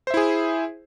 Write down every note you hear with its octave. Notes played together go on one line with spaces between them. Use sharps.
E4 G#4 C5 E5